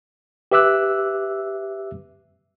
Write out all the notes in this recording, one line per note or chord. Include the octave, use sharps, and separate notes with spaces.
G4 B4 E5 D6 E6 F#6